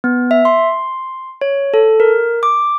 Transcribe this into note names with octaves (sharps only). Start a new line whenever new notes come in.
B3
E5
C6
C#5
A4
A#4
D6